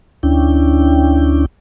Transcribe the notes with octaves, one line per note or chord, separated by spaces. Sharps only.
D2 C#4 D4 E4 G5